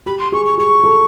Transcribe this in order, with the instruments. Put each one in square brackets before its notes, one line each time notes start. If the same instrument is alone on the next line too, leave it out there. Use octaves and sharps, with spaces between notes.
[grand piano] G4 [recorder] B5
[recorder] C6
[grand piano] G#4 [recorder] C#6
[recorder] C#6
[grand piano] G#4 [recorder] C#6
[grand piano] A4